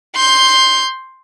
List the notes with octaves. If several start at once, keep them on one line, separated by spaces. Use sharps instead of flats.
C6 G6